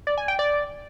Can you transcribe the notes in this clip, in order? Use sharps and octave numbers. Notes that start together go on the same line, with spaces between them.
D5
G#5
G5
D5